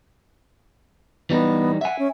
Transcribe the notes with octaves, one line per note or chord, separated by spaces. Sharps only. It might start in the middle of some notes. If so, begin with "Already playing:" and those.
E3 G3 B3 D#4
E5 F#5 G#5
C#4